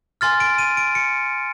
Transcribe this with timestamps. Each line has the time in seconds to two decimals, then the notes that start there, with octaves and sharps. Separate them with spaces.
0.21 G#5 C6 F6 A6
0.40 D7
0.58 D#7
0.77 D7
0.95 C#7